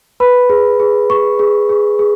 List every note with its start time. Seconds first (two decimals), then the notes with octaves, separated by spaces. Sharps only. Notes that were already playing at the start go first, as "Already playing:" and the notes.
0.20 B4 B5
0.50 G#4
0.80 G#4
1.10 G#4 C#6
1.39 G#4
1.69 G#4
1.99 G#4